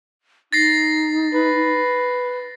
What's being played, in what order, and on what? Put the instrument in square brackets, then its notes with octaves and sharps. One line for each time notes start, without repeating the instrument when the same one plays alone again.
[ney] D#4 [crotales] A6 A#6 C7
[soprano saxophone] B4